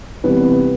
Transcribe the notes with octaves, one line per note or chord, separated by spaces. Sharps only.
C3 E3 G3 B3 B4